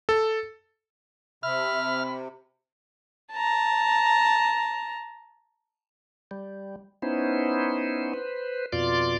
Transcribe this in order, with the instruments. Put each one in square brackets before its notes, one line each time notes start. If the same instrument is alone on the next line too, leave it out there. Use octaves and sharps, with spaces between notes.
[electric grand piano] A4
[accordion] C3 [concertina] E5 [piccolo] B5 [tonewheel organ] F6
[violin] A5 A#5
[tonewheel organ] G3
B3 C#4 D#4 E4 C5
B4 C5
F2 B2 F4 D5 C6 D6